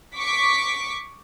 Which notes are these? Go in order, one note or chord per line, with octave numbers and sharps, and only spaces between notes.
C#6 D6 B6